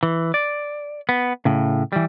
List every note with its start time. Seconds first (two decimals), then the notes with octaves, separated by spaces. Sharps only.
0.03 E3
0.34 D5
1.09 B3
1.45 A2 C#3
1.93 E3 G3